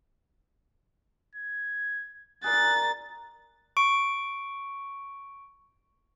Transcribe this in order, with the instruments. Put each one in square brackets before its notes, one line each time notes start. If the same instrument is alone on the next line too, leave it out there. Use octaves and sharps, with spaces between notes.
[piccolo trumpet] G#6
[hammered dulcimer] G#4 A#4 D5 [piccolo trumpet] F#6 [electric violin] A6
[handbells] C#6 D7